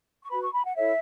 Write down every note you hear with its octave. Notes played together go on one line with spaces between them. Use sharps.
C#6
F#4 B4 B5
C#6
B5
F#5
E4 A4 C#5 E5